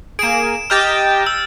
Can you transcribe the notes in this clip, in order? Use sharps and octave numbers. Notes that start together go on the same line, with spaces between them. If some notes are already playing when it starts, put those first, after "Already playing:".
A#3 G#4 D7 E7
G4 D#5 A#5 F6 G6 A6
E6